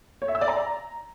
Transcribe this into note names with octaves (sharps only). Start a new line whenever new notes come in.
C#5
E5
E6
D5
A#5